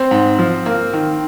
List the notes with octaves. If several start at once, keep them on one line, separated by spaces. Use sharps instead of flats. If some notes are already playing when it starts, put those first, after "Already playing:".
Already playing: C4 C5
G#2
F3
A#3
D#3